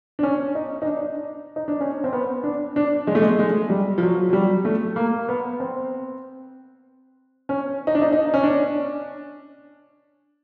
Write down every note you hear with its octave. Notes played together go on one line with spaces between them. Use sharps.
D4
C#4
D#4
D#4
D4
D#4
D4
C#4
C4
B3
D4
D4
G#3
A3
G#3
G#3
G3
F3
F#3
F#3
G3
A3
A#3
B3
C4
C#4
D#4
D4
D#4
D#4
C#4
D4